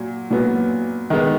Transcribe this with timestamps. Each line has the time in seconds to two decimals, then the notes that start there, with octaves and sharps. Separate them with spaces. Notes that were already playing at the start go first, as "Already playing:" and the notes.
Already playing: A#2 F#3
0.30 A#2 F#3 B3
1.10 D#3 G#3 B3